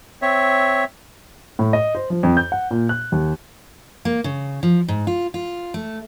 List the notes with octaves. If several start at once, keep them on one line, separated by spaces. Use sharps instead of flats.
C4 C#5 E5
A2
D#5
C5
F3
F2
G6
F#5
A#2
F#6
D#2
A#3
C#3
F3
G#2
F4
F4
A3